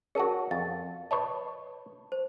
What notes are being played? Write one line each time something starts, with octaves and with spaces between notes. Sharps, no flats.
C#4 F#4 G#4 A#4 A5
F2 A6
B4 C#5 D#5 A5
C5